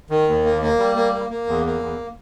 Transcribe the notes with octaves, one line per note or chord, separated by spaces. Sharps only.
D#3
D#2
A#3
A#3
G3
A#3
A#3
A#3
E2
A#3
E2